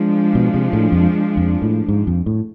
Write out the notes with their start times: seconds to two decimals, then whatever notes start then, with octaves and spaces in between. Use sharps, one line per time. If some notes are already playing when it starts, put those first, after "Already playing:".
Already playing: F3 G#3 D4
0.35 B2
0.54 C3
0.73 A2
0.92 F2
1.37 F2
1.62 A2
1.88 G#2
2.07 F2
2.26 A2